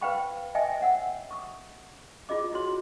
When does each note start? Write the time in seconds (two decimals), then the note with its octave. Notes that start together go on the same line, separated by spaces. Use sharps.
0.01 B4 C5 F5 G5 B5 C#6
0.55 D#5 E5 G5 G#5 D#6
0.81 C#5 F#5 E6
1.31 C#6 D#6
2.29 E4 F4 G#4 D#5 D6
2.52 E4 F#4 C#5 C6